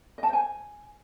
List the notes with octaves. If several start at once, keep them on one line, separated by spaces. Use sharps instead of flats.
D#5
A5
C5
G#5